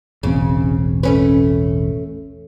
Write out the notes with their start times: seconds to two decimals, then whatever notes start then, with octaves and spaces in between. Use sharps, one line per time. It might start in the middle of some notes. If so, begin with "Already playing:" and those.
0.23 E1 A1 C#3 C4
1.03 A3 C#4 B4